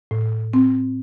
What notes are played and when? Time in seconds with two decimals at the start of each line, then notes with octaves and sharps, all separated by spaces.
0.11 A2
0.53 C4